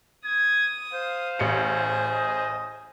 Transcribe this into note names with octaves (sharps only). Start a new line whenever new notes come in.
D#6 G#6
C5 F5
A1 G#4 C#7
D#5